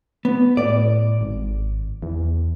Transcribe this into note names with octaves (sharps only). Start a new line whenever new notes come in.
B3
A2 D5
G#1
E2